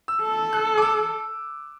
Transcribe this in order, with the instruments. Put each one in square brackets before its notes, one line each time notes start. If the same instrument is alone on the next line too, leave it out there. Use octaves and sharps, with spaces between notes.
[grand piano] E6
[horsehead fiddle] A4
[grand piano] F#6
D6
E6